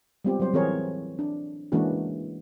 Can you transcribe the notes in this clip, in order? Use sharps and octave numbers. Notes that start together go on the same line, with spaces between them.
G3 G#3 B3 C4 F4 G4
F#3 G3 C5
E3 C4 G#4 A#4 C#5
D4
E3 G#3 A#3 C#4 D4 F#4